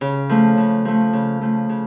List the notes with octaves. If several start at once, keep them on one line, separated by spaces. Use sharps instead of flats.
C#3
F3 A3
C#3
F3 A3
C#3
F3 A3
C#3